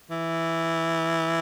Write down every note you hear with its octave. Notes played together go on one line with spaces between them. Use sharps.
E3